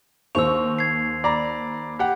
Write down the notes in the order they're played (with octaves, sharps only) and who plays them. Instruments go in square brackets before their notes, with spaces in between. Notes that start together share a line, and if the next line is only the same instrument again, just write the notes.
[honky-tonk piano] D#2 C5 C#6 [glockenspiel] E6 F7
[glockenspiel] G#6 C7
[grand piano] D5 A#5 [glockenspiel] B5
[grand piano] G4 F#5